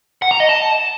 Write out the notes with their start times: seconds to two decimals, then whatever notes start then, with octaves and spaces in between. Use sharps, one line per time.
0.22 F#5
0.31 A#5
0.40 D#5
0.49 A5